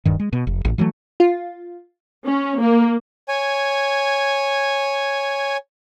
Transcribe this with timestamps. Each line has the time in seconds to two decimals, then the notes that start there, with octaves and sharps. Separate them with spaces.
0.05 D1 G2 D#3
0.20 G#3
0.33 B2
0.47 F1
0.65 A1
0.78 E3 F#3 G3 A3
1.20 F4
2.26 C#4
2.61 A#3
3.29 C#5 G#5